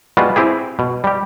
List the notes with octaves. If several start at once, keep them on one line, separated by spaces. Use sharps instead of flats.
G3 G#3 B3 F4 F#4
C4 E4 G4 G#4
B2
G3 G4